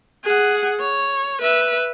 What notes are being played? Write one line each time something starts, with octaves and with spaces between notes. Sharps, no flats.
G#4 F#5
C#5
B4 E5